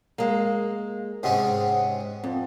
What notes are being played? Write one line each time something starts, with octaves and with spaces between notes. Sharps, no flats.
G#3 A#3
G#2 C3 C#4 G#4 F#5
F2 C4